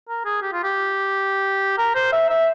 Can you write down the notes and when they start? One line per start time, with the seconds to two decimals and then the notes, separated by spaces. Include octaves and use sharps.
0.09 A#4
0.25 G#4
0.42 G4
0.53 F4
0.64 G4
1.78 A#4
1.95 C5
2.13 E5
2.29 E5